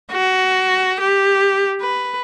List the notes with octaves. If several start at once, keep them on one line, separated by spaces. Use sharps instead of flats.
F#4
G4
B4